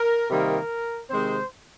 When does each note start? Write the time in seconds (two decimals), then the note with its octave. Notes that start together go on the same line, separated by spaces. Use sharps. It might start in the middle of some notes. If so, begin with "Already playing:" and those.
Already playing: A#4
0.30 C3 D#3 G3 A#3 A#4
1.10 C3 D#3 G#3 C4 C5